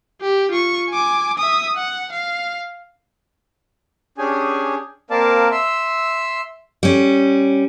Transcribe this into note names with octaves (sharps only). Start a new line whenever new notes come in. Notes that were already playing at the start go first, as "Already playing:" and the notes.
G4
F4 C#6
G#5 D6
E5 D#6
F#5
F5
C#4 D4 G4 G#4 G#5
A#3 C4 A#4 D5 F5 A5
E5 C6 E6
G3 C#4